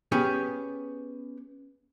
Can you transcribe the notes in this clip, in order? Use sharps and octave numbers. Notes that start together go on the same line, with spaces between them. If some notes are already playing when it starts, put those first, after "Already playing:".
B3 C#4 G4 G#4